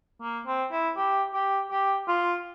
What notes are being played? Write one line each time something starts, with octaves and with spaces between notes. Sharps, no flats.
A#3
C4
E4
G4
G4
G4
F4